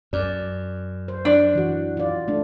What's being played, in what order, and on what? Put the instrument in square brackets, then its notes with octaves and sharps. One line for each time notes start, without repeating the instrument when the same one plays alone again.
[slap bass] F#2 [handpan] D5
[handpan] C5
[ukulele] D4
[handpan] E3 F#4
F4 D5
A3 D4